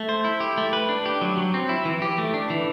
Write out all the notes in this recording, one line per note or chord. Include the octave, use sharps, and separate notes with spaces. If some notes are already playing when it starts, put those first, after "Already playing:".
Already playing: A3
C5
E4
G4
A3
B4
D4
G4
F#3
F#3
C4
E4
E3
G4
A3
D4
E3